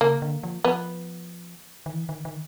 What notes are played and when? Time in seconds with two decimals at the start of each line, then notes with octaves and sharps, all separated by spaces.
0.01 C#3 A#3
0.22 D3
0.43 F3
0.64 F3 B3
1.86 D#3
1.93 E3
2.09 D#3
2.25 D#3